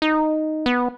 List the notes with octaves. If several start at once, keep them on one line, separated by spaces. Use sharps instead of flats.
D#4
B3